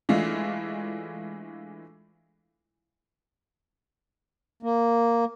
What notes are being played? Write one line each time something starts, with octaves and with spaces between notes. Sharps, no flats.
E3 G#3 A3 D4 F4
A#3